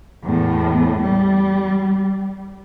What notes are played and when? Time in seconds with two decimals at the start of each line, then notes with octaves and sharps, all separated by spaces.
0.23 E2 A2
1.02 G3